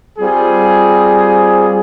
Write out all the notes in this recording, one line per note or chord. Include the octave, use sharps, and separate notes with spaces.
G3 C4 F4 G#4